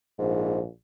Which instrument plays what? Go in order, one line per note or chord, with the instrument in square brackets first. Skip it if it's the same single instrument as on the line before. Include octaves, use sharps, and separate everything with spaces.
[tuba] A#1 [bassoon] G#2